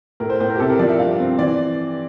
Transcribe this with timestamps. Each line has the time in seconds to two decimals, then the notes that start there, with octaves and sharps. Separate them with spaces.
0.20 A2 A#4
0.30 C5
0.40 A2 C5
0.50 A#4
0.55 G4
0.60 C3 A4
0.70 A#4
0.79 F3 D5
0.89 E5
0.99 G2 F5
1.19 C4
1.39 E3 D5